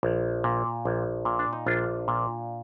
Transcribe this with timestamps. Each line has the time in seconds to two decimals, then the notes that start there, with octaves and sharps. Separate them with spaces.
0.03 A#1
0.44 A#2
0.85 A#1
1.25 A#2
1.39 D4
1.53 D#4
1.66 A#1 D4 F4
2.08 A#2